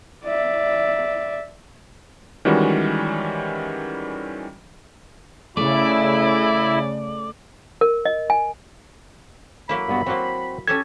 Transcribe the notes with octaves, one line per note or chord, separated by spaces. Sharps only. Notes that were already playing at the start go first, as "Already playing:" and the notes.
D5 E5
D#3 E3 G3 G#3 C#4 F#4
C#3 A3 E4 D5
A#4
D#5
G#5
F#3 A#3 E4 B5
G2 B3 F#4
F#3 A#3 C4 F#4 C5
C#4 G4 A4 G#6